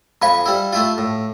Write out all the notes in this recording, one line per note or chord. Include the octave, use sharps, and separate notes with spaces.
F2 F5 G#5 B5 C#6
G3 E4
A3 E4 F4
A2